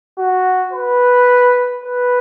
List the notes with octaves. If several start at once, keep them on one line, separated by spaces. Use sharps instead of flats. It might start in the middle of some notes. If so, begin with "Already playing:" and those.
F#4
B4
B4